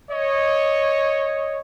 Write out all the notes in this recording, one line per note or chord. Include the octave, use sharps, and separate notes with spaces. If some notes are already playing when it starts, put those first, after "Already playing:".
C#5 D#5